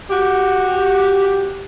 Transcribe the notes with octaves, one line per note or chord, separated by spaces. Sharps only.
F#4 G4